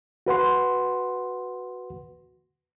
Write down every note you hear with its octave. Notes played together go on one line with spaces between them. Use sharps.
F#4 B4 F#5 C6